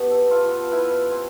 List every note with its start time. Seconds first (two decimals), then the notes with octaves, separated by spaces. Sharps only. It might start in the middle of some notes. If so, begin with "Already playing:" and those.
Already playing: A3 B3 G4 B4
0.11 A4
0.31 F4 A4
0.51 B4
0.71 E4 B4
1.11 C4